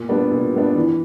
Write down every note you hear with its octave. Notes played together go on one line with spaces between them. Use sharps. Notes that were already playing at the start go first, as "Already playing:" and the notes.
Already playing: A#2
G3 B3 D4
A#2
G3 B3 D4
E3